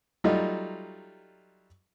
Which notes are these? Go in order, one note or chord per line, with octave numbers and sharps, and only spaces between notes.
F#3 G3 A3 D#4 F4